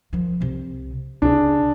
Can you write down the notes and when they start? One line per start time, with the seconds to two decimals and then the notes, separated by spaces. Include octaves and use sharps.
0.13 D#3 F3
0.40 C2 C3
1.22 C#2 C3 D4 G#4